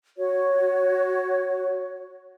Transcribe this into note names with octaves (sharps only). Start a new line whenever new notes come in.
F#4 C#5